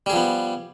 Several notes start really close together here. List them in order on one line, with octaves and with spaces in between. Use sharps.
G3 G#4 F3 B3